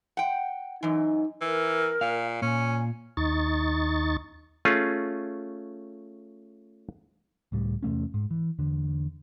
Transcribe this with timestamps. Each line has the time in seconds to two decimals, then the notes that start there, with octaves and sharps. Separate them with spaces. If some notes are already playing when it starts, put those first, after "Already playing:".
0.17 F#5 G5
0.83 F#2 E3 D#4
1.41 E3 A#4
2.01 A#2 F5
2.42 A#2 C#4 G#5
3.17 D#2 D#4 C#6 A6
4.65 A3 C#4 F4 G#4
7.52 C#2 A2 G3
7.83 E2 C3 A3 C#4
8.14 G#2
8.31 E3
8.59 E2 D3